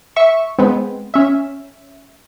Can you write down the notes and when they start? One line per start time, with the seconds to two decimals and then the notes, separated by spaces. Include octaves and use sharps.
0.16 E5 C#6
0.58 G#3 B3 C4
1.14 C#4 E5